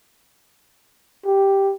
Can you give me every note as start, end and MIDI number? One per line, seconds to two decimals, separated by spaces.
1.26 1.74 67